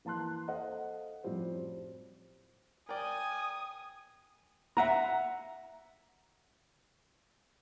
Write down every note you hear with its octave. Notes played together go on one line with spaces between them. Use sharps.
E3 A#3 A5 C6 F#6
A4 C5 D#5 F5 F#5
F#2 A2 F3 G3 C4
A#4 D5 G5 G#5 D#6
E5 F#5 A#5